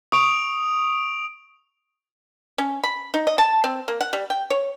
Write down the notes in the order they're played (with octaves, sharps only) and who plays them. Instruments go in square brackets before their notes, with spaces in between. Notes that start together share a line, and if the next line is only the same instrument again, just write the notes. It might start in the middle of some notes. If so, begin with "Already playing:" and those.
[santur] C#6 [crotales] D#6 D7 F7
[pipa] C#4
B5
D#4
D#5
A5
C4
A#3
F#5
G3
G5
C#5